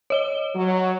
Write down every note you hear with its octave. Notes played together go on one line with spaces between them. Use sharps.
C#5 D#5 G7
F#3